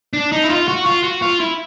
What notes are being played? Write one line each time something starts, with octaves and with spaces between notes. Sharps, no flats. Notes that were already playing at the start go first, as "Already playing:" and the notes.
D4
D#4
E4
F4
F#4
F4
F#4
F4
E4